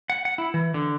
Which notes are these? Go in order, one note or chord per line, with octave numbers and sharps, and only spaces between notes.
F#5
F#5
E4
E3
D3